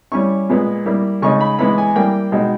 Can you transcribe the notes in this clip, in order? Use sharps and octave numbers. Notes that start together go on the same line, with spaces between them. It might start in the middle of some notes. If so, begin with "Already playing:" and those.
G3 C#4 E4 C#6
A#2 G#3 B3
G3 A#3 E4
C#3 G#3 D#4 C#6
B5
E3 G#3 B3 E4 B5
G#5
G3 A#3 E4 G5
B2 G#3 D#4